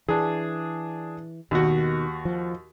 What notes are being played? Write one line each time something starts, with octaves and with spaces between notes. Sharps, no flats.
E3 D4 G#4
D#2 B2 D#3 F#4
F3